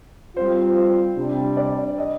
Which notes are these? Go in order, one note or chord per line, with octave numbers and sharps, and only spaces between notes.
G3 C4 F4 C5
C3 G3 D4
D5
D#5